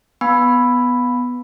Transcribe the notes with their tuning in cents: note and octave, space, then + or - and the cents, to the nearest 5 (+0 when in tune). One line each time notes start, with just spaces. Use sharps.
B3 +0 G#5 +0 B5 +0